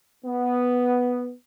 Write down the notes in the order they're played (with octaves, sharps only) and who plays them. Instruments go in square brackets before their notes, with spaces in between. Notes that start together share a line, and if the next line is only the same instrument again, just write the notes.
[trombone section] B3